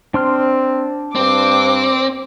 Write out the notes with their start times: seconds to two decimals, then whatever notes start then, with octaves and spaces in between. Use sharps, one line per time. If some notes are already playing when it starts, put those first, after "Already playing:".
0.14 C4 D4 C6 F6
1.15 G2 C4 D6